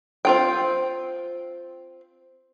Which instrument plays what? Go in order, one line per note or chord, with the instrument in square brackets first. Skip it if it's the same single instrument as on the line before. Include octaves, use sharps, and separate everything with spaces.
[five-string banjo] C4 F4 G5